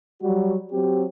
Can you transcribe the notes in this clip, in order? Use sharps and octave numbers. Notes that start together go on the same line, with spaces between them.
F#3 G3 F#4
F#3 C4 G4